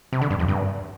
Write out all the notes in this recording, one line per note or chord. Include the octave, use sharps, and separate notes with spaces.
C3
D3
G2
F2
G2